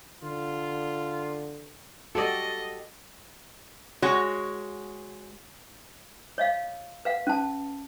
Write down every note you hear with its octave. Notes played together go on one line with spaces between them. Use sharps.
D3 F4
F#4 G4 A4 D5 D#5
G#3 F#4 C#5
C#5 D#5 F5
B4 F5 F#5
C#4 A5